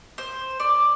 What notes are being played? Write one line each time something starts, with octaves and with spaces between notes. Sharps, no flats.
C5
D5